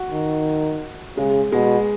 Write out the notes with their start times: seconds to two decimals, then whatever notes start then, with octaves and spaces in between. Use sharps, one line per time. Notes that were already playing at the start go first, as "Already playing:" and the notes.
Already playing: F#4
0.11 D#3
1.17 C#3 G#3
1.52 B2 G#3